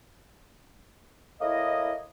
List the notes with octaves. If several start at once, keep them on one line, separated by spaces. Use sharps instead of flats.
A2 A#3 E4 D#5